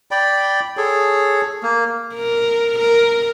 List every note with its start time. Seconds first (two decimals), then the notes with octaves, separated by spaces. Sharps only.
0.11 D5 G5 B5
0.77 G#4 A4 C#5
1.63 A#3
2.15 A#4
2.78 A#4